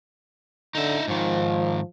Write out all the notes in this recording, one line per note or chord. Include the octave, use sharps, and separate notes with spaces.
D3 D#4 E5
G#2 D#3 F3